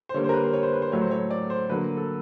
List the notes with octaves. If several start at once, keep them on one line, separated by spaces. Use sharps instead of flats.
C5
D3 G3 A#3 C#5
A#4 C5
B4
C5
C#5
C5
B4
C5
A2 F#3 A3 C#5
C5
C#5
D5
C5
D3 F#3 A#3 B4
A4